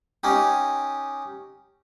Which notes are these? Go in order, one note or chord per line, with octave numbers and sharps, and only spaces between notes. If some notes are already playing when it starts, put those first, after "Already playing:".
C#4 D#4 G4